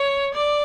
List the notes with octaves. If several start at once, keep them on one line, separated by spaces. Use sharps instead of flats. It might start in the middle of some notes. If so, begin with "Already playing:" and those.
Already playing: C#5
D5